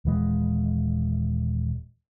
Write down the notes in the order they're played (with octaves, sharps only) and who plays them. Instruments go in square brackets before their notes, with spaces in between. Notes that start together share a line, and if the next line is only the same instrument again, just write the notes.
[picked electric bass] D#1 E3 G#3